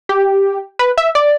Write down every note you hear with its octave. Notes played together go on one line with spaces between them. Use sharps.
G4
B4
E5
D5